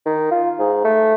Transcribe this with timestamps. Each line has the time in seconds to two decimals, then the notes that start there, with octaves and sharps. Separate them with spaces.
0.06 D#3
0.31 F4
0.59 G#2
0.84 A3